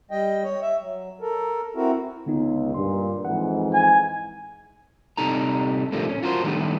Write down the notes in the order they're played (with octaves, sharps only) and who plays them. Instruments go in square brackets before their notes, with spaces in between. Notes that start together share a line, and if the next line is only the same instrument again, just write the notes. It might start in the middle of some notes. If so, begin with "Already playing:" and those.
[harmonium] G3 D#5 G5
C#5
E5
F#3
A4 A#4
C4 E4 F#4 A#4
[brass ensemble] C#2 [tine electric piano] D3 B3 D#4
[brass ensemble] G2 A#2 [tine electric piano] C6
[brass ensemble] F2 G#2 E3 [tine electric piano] F#5
[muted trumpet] G#5
[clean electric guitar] C3 G3 D#4 A4 A#5
A#2 D3 F3 G3 A3 A#3
C#4
F4 F#4 A#4 C5
D#3 G3 A3 B3 D4 G4